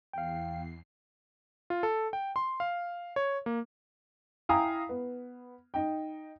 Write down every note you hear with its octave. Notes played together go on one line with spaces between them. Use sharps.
E2 F5 G5 C7
F4
A4
G5
C6
F5
C#5
A#3
E4 F5 G5 G#5 A#5 D#6
B3
D#4 G5